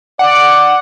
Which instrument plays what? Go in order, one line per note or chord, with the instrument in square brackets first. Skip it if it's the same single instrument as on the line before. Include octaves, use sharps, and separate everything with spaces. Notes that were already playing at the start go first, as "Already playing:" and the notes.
[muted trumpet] D5 [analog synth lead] F#5